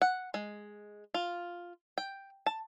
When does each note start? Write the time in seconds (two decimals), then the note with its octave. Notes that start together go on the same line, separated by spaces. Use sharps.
0.02 F#5
0.34 G#3
1.14 F4
1.98 G5
2.46 A5